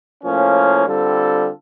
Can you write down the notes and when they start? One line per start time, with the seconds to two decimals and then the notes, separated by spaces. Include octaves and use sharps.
0.23 A2 F3 A#3 C#4
0.87 D3 G3 C4 F4 A4